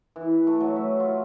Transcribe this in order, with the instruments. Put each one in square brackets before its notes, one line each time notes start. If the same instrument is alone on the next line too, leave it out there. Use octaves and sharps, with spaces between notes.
[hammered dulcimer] E3
A3
F#3
E5
F4